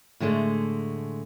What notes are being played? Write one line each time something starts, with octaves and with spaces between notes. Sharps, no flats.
A2 D3 G#3 A3